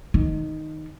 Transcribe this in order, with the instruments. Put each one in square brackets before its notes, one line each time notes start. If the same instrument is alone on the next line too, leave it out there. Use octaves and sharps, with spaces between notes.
[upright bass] D#3